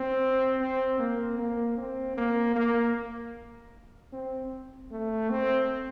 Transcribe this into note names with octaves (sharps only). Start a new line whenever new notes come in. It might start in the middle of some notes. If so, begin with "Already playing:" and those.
Already playing: C4
C4
A#3
A#3
C4
A#3
A#3
C4
A3
C4